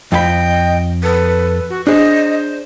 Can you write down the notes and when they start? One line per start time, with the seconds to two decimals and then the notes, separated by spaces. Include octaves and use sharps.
0.12 F2 F4 D#5 G5 B5
1.03 A4 B4
1.70 F#4
1.87 D4 G#4 C5 D#5